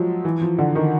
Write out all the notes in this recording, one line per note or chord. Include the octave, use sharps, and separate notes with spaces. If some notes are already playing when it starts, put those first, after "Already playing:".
Already playing: F3 F#3 G#3
E3
F3
D3
D#3